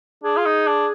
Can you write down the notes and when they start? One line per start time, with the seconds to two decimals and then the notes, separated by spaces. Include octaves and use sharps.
0.23 D4 G#4
0.37 F4
0.45 D#4
0.67 D4